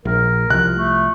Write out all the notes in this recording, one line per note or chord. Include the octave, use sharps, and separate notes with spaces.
A#1 A#4
C2 F3 F#6
A3